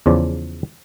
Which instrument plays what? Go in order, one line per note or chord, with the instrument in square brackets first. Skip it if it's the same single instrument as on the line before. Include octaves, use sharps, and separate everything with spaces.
[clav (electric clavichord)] E2 C#3 F3 D5